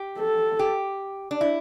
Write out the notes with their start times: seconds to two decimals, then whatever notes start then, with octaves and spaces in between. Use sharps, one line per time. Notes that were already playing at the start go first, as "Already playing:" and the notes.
Already playing: G4
0.19 A4
0.59 G4
1.31 D4
1.41 E4